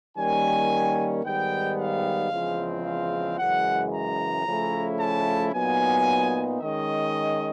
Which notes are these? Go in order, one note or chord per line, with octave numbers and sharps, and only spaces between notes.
D#3 G3 A#3 C#4 G#5
G#2 D#3 G3 B3 G5
F5
E2 C#3 F3 G#3 C4
F5
F#2 C#3 E3 G#3 F#5
A#5
C#3 F3 A3 C#4 E4
A5
A#2 F#3 B3 D#4 G#5
D#3 G#3 C#4 D#5